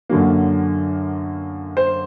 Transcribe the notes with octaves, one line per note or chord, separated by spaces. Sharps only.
F#2 D3 F#3 A#3
C5